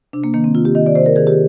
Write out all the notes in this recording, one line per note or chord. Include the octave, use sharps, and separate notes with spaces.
C3 D4
A#3
D#3 A#3
C4
C3 F4
G4
D#3 D#5
D5
C3 C5
A#4
D#3 G#4
G4